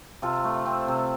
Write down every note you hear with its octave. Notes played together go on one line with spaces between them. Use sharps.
C3 F4 A4
A3
C4
C3